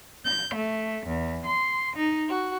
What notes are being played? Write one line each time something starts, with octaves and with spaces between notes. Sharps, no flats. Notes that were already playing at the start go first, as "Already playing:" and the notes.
G6
A3
E2
C6
D#4
F#4